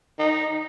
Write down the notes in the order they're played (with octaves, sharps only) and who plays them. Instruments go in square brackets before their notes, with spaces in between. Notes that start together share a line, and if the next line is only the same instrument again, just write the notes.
[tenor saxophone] D#4